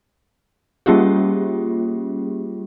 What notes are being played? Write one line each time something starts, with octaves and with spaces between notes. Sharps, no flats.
G3 A#3 C#4 F4 G4 G#4